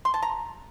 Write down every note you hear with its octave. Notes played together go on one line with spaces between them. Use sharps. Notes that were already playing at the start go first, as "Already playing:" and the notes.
C6
A5
A#5